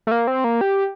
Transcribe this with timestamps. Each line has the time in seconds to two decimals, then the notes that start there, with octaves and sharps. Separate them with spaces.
0.07 A3
0.11 A#3
0.27 C4
0.44 A#3
0.61 G4